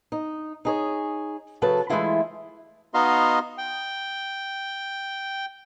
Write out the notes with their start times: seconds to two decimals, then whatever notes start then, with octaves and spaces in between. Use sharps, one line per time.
0.12 D#4
0.65 D#4 G#4 C#5
1.62 C#3 F#3 A4 B4 A5
1.90 E3 F3 G#3 A3 E4 F4
2.94 B3 D#4 F#4 D#5 F5 C6
3.58 G5